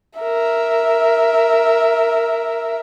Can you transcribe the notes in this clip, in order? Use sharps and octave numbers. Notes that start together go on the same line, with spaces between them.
A#4 E5